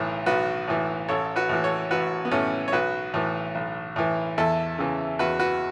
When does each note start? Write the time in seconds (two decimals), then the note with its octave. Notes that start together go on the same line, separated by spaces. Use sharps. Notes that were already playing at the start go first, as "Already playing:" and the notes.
Already playing: B1 A2 E3
0.26 B1 F#4 B4
0.68 A2 E3
1.08 A1 A4 C#5
1.36 F#4 B4
1.49 A2 E3
1.64 A4 C#5
1.91 A1 F#4 B4
2.25 B3
2.31 A2 E3 A3 C#4
2.68 C#5
2.72 B1 F#4 B4
3.14 A2 E3
3.55 B1
3.96 A2 E3
4.38 E2 E4 A4
4.78 C#3 E3
5.19 E2 F#4 B4
5.39 F#4 B4